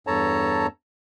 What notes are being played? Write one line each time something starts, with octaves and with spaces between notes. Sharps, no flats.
E2 G2 A4 C#5 A5 A#5